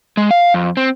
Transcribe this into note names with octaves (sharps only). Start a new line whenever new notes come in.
G#3
F5
F2
C4